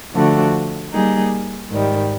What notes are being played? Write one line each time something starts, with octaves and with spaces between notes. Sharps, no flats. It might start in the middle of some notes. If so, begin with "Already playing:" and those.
D3 F3 A3 D4 F#4
G3 A#3 D#4 G#4
G#2 D#3 G3